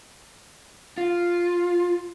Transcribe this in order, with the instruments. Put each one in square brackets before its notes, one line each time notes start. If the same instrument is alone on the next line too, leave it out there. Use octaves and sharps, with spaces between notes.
[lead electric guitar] F4